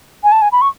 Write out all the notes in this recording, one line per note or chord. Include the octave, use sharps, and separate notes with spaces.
G#5
A5
G#5
B5
C#6